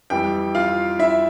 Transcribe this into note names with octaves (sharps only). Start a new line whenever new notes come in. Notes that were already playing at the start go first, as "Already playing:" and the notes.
F2 E3 G3 G4 G5
F4 F5
E4 E5